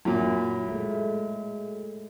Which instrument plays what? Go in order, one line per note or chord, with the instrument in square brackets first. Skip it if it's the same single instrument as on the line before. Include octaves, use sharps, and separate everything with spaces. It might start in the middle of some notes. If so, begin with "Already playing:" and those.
[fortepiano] F#2 A#2 [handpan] E4
[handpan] G#3 A3